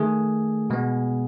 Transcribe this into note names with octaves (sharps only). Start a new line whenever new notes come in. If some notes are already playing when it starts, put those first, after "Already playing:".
Already playing: D#3 A3 G#4
B2 G#3 B3